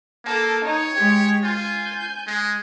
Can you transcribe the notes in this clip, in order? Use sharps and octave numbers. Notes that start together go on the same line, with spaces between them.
A#3 A4
D#4 C#5
G#3 G4
F4 G#5 G6
G#3